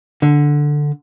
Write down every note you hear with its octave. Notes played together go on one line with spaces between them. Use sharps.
D3